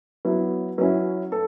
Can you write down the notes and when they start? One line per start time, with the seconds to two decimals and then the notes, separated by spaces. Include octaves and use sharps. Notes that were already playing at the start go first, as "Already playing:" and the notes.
0.25 F#3 B3 E4
0.78 F#3 C#4 E4
1.32 A4